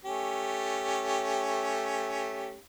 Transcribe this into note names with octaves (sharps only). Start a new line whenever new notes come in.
A3 C#4 G4